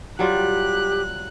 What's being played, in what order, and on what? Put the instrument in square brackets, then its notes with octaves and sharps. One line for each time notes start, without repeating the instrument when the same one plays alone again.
[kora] F#3 G3 F4 [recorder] G4 [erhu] F#6